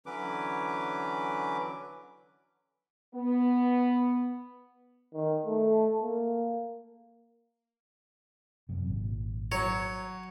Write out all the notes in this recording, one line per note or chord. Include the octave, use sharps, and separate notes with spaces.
D3 E3 F#3 C#4 B4 D6
B3
D#3
A3
A#3
F#2 C3
G#1 A#2
F#3 C#5